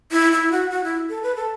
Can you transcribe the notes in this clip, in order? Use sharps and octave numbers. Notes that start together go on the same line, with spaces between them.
E4
E4
F#4
F#4
E4
A4
B4
A4